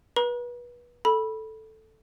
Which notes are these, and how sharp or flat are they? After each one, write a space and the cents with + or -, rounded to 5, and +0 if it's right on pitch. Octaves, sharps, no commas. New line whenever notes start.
B4 -30 A#5 +45
A4 +0 B5 -15